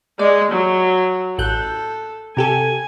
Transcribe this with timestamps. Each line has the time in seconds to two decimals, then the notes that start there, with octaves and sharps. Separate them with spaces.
0.19 G#3 D5
0.52 F#3
1.38 A1 A4 F#6 G6
2.37 C3 G4 A4 G#5